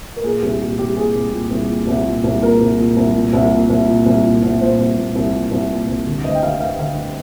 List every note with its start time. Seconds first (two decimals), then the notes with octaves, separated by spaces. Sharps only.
0.16 A#4
0.23 A#2 G#4
0.41 C2 G4
0.60 A#2 G4
0.78 C2 G4
0.97 A#2 G#4
1.15 C2
1.33 A#2
1.51 C2
1.69 A#2
1.87 C2
2.06 A#2
2.24 C2
2.42 A#2 A#4
2.61 C2
2.78 A#2
2.96 C2
3.15 A#2
3.33 C2
3.52 A#2
3.69 C2
3.88 A#2
4.06 C2
4.24 A#2
4.42 C2
4.61 A#2 C5
4.78 C2
4.97 A#2
5.15 C2
5.33 A#2
5.51 C2
5.70 A#2
5.88 C2
6.06 D3
6.24 D2 D#5
6.35 G5
6.43 D3 F5
6.60 D2 F5
6.79 D3 F5
6.96 D2